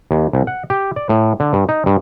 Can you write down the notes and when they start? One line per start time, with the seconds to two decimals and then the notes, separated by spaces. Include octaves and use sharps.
0.11 D#2
0.33 C2
0.47 F#5
0.70 G4
0.96 D5
1.09 A2
1.40 D3
1.53 G2
1.69 D#4
1.86 G2